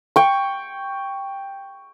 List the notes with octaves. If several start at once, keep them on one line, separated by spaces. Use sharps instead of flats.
G5 C#6